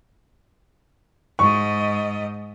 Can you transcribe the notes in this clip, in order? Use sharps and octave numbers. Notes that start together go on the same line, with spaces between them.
G#2 D#5 C#6